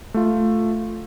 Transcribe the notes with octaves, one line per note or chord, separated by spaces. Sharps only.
A3 F4